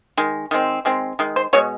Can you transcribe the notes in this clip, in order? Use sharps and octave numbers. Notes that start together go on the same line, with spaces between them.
D#3 G#3
D#3 G#3 C4
D#3 G#3 C4
D#3 G#3
C5
B2 G#3 C#5